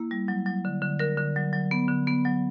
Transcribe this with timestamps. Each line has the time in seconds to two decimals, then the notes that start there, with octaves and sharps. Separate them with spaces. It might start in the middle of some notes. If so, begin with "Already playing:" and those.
Already playing: A#3 E4
0.11 G3
0.28 F#3
0.46 F#3
0.65 D3
0.82 D3
0.99 D3 A#4
1.18 D3
1.36 F#3
1.53 F#3
1.71 B3
1.88 D3
2.07 B3
2.25 F#3